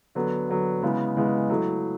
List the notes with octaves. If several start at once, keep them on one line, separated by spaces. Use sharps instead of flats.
D3 F#3 B3
D3 F#3 B3
C#3 G#3 B3 E4
C#3 G#3 B3 E4
F#3 A3 E4